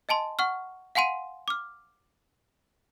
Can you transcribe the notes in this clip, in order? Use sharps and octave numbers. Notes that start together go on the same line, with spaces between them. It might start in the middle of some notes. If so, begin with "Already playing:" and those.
D#5 G#5 A5 C6
F#5 C#6 F6
F5 F#5 G#5 C6 D#7
D6 F6